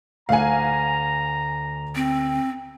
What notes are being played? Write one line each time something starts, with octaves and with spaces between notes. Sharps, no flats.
D2 F5 F#5 G#5 A#5
C4